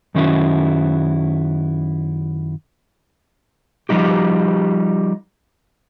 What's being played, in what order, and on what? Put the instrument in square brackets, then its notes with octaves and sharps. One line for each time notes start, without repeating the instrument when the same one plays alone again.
[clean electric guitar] F#2 D#3 C#4 E4 F#4
[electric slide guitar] F3 G3 D#4 G4